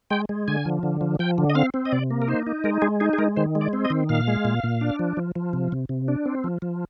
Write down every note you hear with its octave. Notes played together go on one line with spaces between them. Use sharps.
G#3 G5
G#3
D3 G#5
F3
D3
F3
F3 G5
D3
D#5
C4 F5
C4
D#5
C3 D5
A#3
A#4
D#4 C5
D#4
G#3 A#4
G#3 G#4
D#4 G#4
G#4
G#3 A#4
D#3 C5
G#3
D5
C4
D#5
D#3
A#2 F5
G#3
A#2
A#2
D4
F3
F3
F3
C3
C3
C3
D4
C4
F3
F3